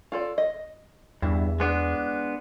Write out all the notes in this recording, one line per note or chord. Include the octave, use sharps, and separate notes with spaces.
F4 A4 D5
D#5
E2 G2 E4
G#3 B3 D4